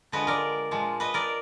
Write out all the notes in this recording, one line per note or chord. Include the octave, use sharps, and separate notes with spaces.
D3 F3 G#3 B4 D#5
A#4 D5
A#2 F3 G#3
B4 D#5
A#4 D5